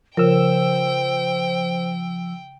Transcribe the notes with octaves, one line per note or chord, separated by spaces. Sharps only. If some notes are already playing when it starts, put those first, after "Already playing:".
C#3 F3 A#4 C5 G5 E6